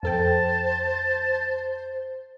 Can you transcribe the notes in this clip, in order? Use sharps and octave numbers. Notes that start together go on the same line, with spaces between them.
F2 A4 C5 G5 A5